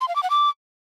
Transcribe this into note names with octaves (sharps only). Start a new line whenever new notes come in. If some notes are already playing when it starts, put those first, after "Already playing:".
C6
F5
D6
F#5
D6